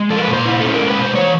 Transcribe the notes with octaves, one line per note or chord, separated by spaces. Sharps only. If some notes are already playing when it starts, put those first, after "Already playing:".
Already playing: G#3
F3 A4
A#4
B4
A#2
C5
E4
C#4 A4
A#4
G#3
B4
B2 C5
E3 C#5